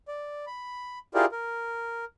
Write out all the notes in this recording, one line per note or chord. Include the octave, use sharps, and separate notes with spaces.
D5
B5
E4 F4 G4 G#4 A#4 D5
A#4